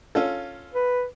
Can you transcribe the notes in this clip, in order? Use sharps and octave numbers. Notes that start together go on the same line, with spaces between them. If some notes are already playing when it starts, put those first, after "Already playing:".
C#4 F4 A4
B4